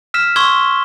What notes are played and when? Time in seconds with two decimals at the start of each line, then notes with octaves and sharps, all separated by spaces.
0.14 E6 F6 B6 E7
0.36 C6 C#6 E6 G#6 G7